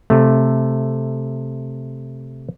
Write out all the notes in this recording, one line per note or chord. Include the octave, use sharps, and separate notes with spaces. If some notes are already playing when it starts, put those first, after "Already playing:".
C3 A3